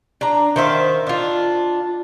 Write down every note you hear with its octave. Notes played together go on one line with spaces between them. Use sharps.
D4 A#5
D#3 C5 E5 F5
D4 F4